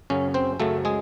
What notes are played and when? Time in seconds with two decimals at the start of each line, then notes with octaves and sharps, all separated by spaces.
0.10 F#2 C#3 F#3 C#4
0.34 C4 C5
0.60 F#2 C#3 F#3 A3 A4
0.85 G#3 G#4